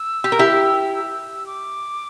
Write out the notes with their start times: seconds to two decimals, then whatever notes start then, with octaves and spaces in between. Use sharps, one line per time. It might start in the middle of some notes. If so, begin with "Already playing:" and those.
Already playing: E6
0.24 G4
0.32 A#4
0.39 E4 G4
1.46 D6